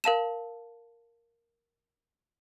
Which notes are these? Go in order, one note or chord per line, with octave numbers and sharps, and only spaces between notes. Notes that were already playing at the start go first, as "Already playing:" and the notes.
A#4 F5 A5 E7